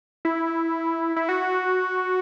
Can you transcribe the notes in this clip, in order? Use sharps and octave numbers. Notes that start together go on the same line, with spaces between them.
E4
E4
F#4